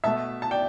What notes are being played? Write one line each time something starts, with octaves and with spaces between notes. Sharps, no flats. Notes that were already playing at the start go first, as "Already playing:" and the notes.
B2 A3 E5 A5
A5
D5 G5